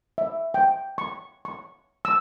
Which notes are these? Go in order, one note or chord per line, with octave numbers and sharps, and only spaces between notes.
E5
G5
C#6
C#6
E6